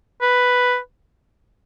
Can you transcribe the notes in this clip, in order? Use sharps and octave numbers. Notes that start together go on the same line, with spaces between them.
B4